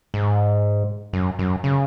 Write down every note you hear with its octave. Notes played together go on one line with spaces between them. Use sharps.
G#2
F#2
F#2
C#3